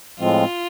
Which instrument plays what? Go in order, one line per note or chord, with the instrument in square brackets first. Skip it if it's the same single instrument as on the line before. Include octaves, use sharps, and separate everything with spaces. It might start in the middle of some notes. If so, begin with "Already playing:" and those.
[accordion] A2 F3 G#3 C4 [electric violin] F4